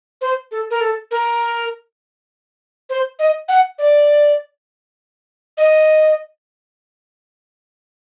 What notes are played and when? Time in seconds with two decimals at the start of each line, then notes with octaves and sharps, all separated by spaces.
0.21 C5
0.51 A4
0.70 A#4
0.81 A4
1.11 A#4
2.89 C5
3.19 D#5
3.48 F#5
3.78 D5
5.57 D#5